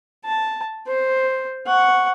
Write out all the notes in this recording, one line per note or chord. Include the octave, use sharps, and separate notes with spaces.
A5
C5
F#5 C#6